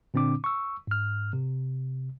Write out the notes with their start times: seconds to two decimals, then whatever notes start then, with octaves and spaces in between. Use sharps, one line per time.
0.14 A#2 D3 C4 D4 D6
0.44 C#6 E6
0.87 G#2 F6
1.33 C3